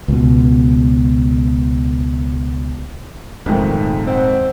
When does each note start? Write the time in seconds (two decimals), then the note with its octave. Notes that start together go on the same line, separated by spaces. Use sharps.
0.08 C#2 B2
3.46 D#1 F2 G#2 D#3 F#3 G#3 A3 C4
4.07 C4 D#5 F#5